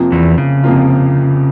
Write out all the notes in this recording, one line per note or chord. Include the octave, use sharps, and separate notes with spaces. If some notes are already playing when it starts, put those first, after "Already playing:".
Already playing: F2 C3 F3 A#3 F4
E2 E3
C#3
F2 C3 F3 A#3 F4